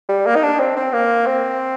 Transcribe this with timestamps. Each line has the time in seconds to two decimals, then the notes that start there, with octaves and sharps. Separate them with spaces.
0.09 G3
0.27 A#3
0.35 D#4
0.43 D4
0.59 C4
0.76 C4
0.93 A#3
1.26 C4